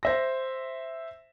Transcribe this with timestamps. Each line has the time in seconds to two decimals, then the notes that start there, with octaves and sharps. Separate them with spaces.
0.03 C5 E5 A#6